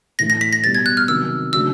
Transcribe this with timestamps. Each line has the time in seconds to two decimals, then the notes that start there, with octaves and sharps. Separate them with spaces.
0.19 A2 E3 A3 A#6
0.30 A#6
0.41 B6
0.53 A#6
0.64 B2 G3 B3 A6
0.75 G#6
0.86 F#6
0.97 F6
1.08 C3 D#3 F#3 E6
1.53 C#3 F#3 A3 D4 F#4 E6